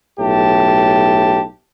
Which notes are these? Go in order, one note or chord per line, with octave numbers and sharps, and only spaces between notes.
B1 A2 G4 A5